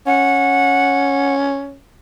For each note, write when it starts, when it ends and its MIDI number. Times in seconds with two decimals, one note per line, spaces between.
0.06 1.76 61
0.06 1.34 78